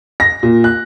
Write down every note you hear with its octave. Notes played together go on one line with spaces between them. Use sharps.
A#6
A#2
F#6